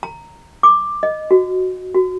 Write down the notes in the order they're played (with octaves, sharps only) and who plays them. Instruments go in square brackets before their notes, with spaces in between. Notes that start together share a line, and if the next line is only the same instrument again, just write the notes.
[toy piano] A#5
D6
D#5
F#4
F#4